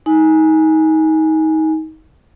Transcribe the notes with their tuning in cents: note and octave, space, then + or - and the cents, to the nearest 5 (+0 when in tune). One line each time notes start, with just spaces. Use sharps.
D#4 +25 G#5 +0